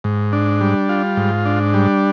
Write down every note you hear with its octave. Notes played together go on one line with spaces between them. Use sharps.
G#2
D4
G3
F4
G#2
D4
G3